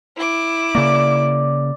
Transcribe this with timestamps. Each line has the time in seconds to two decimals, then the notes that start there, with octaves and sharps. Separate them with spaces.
0.17 E4 D6
0.75 C#3 A#3 D5